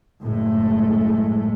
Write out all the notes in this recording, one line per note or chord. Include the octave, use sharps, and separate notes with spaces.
F#1 A2 G#3 A3